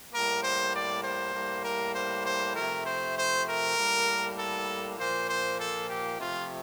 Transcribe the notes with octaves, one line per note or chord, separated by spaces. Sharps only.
A2 G3 A#3 A#4
C5
D5
C5
A2 G3 A#3
A#4
C5
C5
C3 F3 A3 A#4
C5
C5
A#4
A2 G3 A#3
A4
A#2 F3 A#3 C5
C5
A4
G4
C3 F3 A3 F4